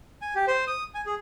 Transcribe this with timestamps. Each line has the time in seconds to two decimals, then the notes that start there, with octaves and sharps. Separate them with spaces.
0.22 G#5
0.35 G4
0.47 C5
0.67 D#6
0.94 G#5
1.06 G#4